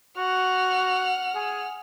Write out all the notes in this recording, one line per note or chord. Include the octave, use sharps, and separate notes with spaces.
F#4 F#5 F6
G#4